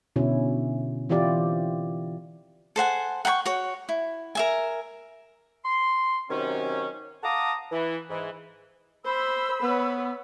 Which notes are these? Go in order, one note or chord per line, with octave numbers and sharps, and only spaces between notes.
B2 D3 C#4 E4
E3 C4 E4 F4 G4 D5
A4 C5 F#5 G#5
F#5 G5 B5 C#6
F#4 C#5
E4
A#4 E5 G#5
C6
C3 D#3 F#3 C#4
F5 F#5 A5 A#5 D6 D#6
E3
G#2 E3
C5 B5 E6
B3 B4 C#5